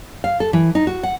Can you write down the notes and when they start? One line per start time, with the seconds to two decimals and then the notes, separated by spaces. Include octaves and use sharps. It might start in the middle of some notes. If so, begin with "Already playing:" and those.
0.24 F5
0.40 A4
0.53 E3
0.75 D#4
0.87 F#4
1.03 F#5